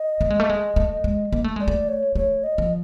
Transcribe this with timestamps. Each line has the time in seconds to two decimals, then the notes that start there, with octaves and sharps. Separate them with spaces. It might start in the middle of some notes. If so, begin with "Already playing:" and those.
Already playing: D#5
0.21 A3
0.30 G#3
0.40 A3
0.49 G#3
0.76 A3
1.04 G#3
1.33 A#3
1.44 A3
1.56 G#3 D5
1.68 A3
1.88 C#5
2.15 A3 C#5
2.44 D#5
2.58 F3